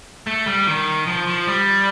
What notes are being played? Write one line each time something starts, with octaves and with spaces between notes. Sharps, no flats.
A3
G3
D#3
F3
F3
G3